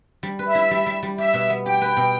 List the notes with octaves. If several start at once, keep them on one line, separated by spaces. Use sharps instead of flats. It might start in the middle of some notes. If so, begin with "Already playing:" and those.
G3
B4
E5
E4
G3
G3
G3
G4 E5
B2
B3
G4 G5
B4
B2